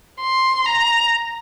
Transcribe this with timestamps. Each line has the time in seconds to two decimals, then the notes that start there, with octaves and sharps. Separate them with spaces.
0.20 C6
0.66 A#5